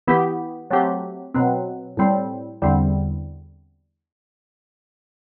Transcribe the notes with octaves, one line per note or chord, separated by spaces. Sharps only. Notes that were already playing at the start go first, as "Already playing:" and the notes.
E3 B3 E4 G4
F#3 A3 C4 G4
B2 F#3 C4
A2 G3 C4
E2 D3 G3 C4